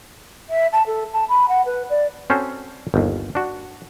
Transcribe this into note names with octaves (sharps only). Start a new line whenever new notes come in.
E5
A5
A4
A5
B5
F#5
B4
D5
C4 C#4 F#4 A4 C5
G1 D#2
D4 F#4